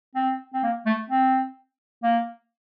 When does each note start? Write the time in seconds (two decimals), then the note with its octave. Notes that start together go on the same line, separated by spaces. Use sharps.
0.15 C4
0.54 C4
0.63 A#3
0.86 A3
1.10 C4
2.03 A#3